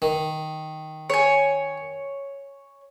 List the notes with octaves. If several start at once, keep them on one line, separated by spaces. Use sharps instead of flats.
D#3
C#5 G#5